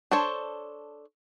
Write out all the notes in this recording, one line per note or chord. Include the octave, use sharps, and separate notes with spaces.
D4 A4 C5 C#5